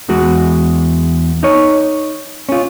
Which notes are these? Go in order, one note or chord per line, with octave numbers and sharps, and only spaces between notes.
E2 G#3 F#4
D#4 C#5
C#4 F4